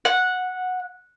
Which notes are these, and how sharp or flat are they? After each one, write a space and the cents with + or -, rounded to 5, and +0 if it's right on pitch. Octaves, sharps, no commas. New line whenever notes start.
F#5 -10